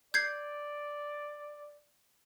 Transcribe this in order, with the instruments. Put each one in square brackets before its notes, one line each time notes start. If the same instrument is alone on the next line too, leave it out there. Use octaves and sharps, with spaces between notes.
[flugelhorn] D5 [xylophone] G6 G#6 C7